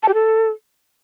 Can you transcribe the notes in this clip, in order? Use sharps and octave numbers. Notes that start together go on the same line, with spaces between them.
A5
G4
A4